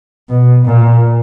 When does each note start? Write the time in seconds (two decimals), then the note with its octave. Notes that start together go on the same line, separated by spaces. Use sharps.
0.30 B2
0.66 A#2